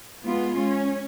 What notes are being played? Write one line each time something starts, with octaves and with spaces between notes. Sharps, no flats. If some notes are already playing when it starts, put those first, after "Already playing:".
G#3 B3 F4
C#4